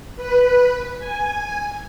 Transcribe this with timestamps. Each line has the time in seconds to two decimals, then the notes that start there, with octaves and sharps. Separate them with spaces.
0.16 B4
0.99 G#5